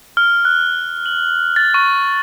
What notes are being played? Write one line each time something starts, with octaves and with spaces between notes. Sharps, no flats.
F6
F#6
F#7
A6
C#6